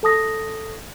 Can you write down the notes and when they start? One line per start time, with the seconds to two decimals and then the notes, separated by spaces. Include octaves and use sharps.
0.03 A4 A5 D#6 A#6